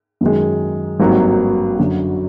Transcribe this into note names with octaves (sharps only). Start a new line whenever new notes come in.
F#2 D#3 G#3
G#1 G2 D#3 F#3 A#3
F#2 D3 F#3